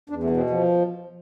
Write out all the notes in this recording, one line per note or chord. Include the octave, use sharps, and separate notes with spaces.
E2 D4
A3
B2
C4
F3 B3